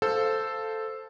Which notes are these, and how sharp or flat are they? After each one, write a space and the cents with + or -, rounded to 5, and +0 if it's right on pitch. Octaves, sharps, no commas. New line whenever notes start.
A4 +0 C5 +0 F5 +0